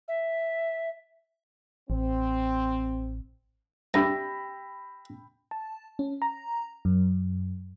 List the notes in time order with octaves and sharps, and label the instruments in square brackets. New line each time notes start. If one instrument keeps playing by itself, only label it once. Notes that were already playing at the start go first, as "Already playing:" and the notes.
[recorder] E5
[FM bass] A1 [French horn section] C4
[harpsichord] G2 [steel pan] G4 E5 [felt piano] G5 B5 E6 [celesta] A#6
[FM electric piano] A5
C#4
A#5
F#2